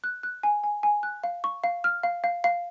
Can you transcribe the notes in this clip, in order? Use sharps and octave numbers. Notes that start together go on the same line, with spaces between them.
F#6
F#6
G#5
G#5
G#5
F#6
F5
C#6
F5
F6
F5
F5
F5